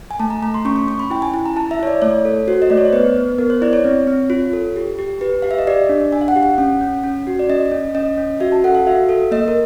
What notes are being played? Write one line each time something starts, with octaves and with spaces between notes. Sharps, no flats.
G#5
A3 A5
A#5
A3 A#5
C6
C#4 C#6
C#6
C#4 C#6
B5
E4 G5
G#5
E4
A#5
E4 A5
E5
E4 C#5
D5
A3 C#5
A4
F#4 C5
D#5
A3 D5
C#5
C5
B3 B4
B3
B3 A#4
C5
E4 D5
C#5
C4
C4
F4
A4
G4
G4
G4 B4
G4 F5
E5
D#5
G4 D5
D4
D4 G#5
F5
F#5
G4
F#5
C#4
C#4
C#4
F#4
D5
C#4 D#5
C#4
C#4 D#5
C#4
F#4 E5
A5
A4 F#5
F5
F#4 E5
A4
A#3 D#5
A#4